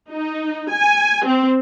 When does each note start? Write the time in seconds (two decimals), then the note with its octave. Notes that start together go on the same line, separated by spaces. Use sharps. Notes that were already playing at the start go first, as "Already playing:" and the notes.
0.11 D#4
0.71 G#5
1.25 C4